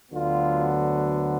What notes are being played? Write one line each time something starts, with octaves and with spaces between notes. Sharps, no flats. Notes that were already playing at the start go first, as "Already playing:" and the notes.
D2 D3 F#3 B3 F4